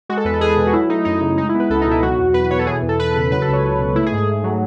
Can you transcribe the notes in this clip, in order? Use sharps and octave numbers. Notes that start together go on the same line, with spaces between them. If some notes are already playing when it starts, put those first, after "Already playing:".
G#3 F#4
A4
E2 B4
A4
E2 G#4
B2
F#4
F#3 E4
A3 D#4
F#2 D#4
C#3
G#3 D#4
E4
B3
B4
C#2 A4
D#4
B2 E4
F#3 F#4
E2
E2 B4
B2 C#5
A4
E3 G#4
E2
A4
E2 B4
C#3
F#3 B4
A4
C#2
C#5
C#2 A4
B2
A3 E4
G#4
G#2
G#4
G#2
F#3